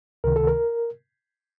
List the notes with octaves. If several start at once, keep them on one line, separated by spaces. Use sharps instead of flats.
C#2 C3 D#3 A#4
A4
A#4